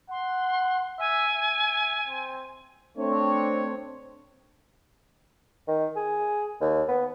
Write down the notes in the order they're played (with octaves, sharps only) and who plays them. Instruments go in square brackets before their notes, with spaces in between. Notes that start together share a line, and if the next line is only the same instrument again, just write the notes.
[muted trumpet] F#5 [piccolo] C6
[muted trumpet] E5 [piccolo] G#5
[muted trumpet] E5
C4
[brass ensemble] A3 C4 D4 C#5
[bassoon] D#3
G#4
D#2
B3